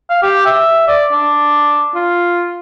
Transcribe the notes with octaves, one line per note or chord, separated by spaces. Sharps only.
F5
G4
E5
D5
D4
F4